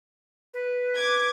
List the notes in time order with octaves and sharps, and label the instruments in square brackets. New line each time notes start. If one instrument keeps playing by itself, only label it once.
[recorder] B4
[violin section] D6 G#6